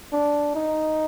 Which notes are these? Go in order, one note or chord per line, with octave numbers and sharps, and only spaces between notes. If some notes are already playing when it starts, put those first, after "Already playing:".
D4
D#4